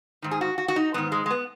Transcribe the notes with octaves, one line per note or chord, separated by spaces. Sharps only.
G#2 D#3
G#4
F#4
F#4
F#4
D#4
G#2 D#3 B3
G#3
G#3
B3